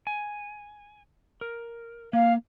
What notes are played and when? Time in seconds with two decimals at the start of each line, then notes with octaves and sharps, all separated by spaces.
0.07 G#5
1.41 A#4
2.13 A#3 F5